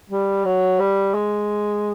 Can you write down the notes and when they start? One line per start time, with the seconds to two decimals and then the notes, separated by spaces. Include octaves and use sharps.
0.10 G3
0.45 F#3
0.79 G3
1.14 G#3